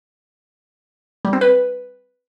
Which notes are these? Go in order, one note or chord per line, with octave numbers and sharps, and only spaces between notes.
G3
C4
B4